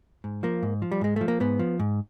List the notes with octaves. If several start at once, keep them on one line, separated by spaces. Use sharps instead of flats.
G#2
F3 A#3
G#2
F3
G3
G#2 G#3
F3 A3
A#3
G#2 B3
F3
G#2